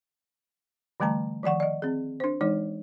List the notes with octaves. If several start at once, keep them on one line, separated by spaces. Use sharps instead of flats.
D3 E3 G3 A3 A5 A#5
D#3 F3 D5 F#5 C#6
D5 D#5
C4 G#4
D4 C5
E3 G#3 D#4 C#5